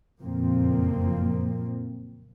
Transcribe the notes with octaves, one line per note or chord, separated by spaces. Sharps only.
F#1 F2 A#2 F3 A#3 C4